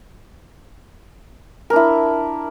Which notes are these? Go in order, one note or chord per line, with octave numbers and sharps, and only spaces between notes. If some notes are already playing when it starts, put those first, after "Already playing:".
D4 E4 A#4